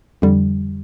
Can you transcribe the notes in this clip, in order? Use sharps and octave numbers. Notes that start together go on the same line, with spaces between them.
F2 D3 G3